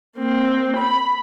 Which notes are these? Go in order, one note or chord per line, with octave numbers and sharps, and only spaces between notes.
A#3 C4
B5